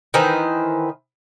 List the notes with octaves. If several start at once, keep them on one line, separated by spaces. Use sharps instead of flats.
D#3 E3 B4 C5